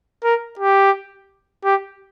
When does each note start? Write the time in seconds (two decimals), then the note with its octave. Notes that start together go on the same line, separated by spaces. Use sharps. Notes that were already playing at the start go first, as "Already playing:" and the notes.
0.24 A#4
0.59 G4
1.65 G4